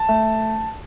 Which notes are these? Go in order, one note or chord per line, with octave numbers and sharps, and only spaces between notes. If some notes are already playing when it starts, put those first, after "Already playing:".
Already playing: A5
A3